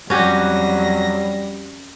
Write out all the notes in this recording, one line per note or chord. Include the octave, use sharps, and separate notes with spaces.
F2 F#3 G3 C#4 F#4 G4 A#6